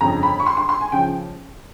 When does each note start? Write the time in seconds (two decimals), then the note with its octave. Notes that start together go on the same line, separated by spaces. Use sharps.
0.01 G1 F2 C#3 A#5
0.23 B5
0.40 C#6
0.46 C6
0.57 C6
0.69 C6
0.81 G#5
0.92 C#3 F3 G5